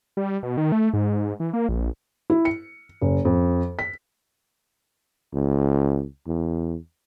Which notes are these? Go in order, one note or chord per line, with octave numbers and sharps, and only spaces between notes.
G3
B2
D#3
A3
G#2
E3
A#3
A#1
E4
C#7
F#1
F2
B6
C#2
E2